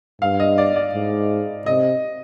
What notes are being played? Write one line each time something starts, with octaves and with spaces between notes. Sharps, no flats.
G2 F5
D#5
D5
D5
G#2
C3 D#5